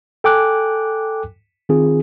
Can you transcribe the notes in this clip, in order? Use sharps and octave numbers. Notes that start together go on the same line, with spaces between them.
A4 G5 G#5 D6 F#6
D#3 C4 F4 G#4